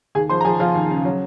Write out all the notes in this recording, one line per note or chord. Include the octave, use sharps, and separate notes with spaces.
D#2 G#4 G#5
F3 C5 C6
A#5
F3 G#4 G#5
F3 F4 F5
D#2
C#3
F#3